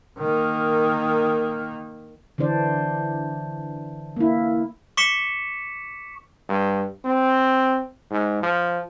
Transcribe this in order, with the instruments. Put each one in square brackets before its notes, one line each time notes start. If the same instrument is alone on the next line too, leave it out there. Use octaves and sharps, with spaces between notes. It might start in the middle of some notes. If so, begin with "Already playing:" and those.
[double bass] D#3 A#3
[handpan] D3 E3 D4 C5 D5
A#3 E4
[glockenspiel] C#6 D6 B6 C#7 E7
[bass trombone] G2
C4
G#2
F3